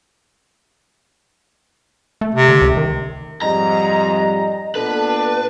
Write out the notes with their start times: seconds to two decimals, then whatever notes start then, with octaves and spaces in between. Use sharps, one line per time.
2.21 A3
2.35 C3
2.49 D3
2.62 C#2
2.77 D#3
3.42 F2 G#2 G3 D#5 A#5
4.75 A#2 B3 D4 A4 B4